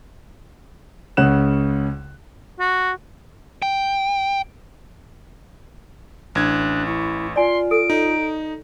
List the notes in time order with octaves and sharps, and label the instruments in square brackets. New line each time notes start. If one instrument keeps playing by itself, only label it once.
[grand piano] C#2 C#3 C#4 F#5 F#6 E7
[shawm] F#4
[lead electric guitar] G5
[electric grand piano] A1 G#6 [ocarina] D4 [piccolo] F#6
[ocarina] E4 [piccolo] C#6
[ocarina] F4 [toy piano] D5 G#5 [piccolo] C6
[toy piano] A4 [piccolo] D7
[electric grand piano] D#4